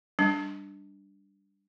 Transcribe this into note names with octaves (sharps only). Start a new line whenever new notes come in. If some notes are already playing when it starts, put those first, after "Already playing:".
G3 D4